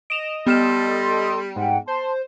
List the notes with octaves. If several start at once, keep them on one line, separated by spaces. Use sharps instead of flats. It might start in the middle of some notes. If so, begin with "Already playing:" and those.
D#5 D7 E7 F7
G3 B3 A4 C6 F6 E7
G#2 F#5 G5
C5 A5 C6